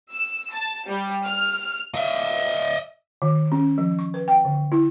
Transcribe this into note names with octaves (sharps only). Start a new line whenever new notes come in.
E6
A5
G3
F6
D#5 E5
D#3
C#4
F3
C#6
B4
G5
D3
E4